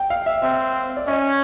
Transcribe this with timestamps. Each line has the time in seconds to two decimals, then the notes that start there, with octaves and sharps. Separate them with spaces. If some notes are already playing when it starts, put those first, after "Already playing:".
Already playing: G5
0.10 F5
0.26 E5
0.42 C4 E5
0.97 D5
1.08 C#4 D#5